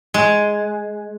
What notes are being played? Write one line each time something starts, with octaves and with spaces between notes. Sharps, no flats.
G#3